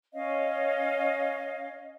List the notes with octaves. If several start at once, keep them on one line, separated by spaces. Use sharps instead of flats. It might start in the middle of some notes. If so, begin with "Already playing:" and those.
C#4 C#5 D#5 F5